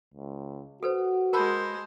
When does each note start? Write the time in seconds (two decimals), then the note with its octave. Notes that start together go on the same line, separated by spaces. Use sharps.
0.14 C#2
0.83 F#4 A4 B4 C5
1.33 G#3 A#4 C5 A5 B5